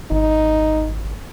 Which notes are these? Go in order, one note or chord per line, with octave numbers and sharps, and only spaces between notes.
G#1 D#4